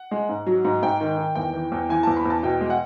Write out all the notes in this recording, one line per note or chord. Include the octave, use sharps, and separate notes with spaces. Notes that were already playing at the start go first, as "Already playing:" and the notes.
Already playing: F#5
G#3
G#2
F#3
G#2
G#2 G5
D#3
D#3
E2 G5
E3
E2
E3 G#5
E2 A5
B5
E2 A5
B2 G5
G#3
F#5